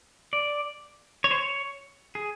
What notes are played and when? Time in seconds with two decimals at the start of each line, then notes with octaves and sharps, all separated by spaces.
0.33 D5
1.24 C#5
1.31 C5
1.38 C#5
2.15 G#4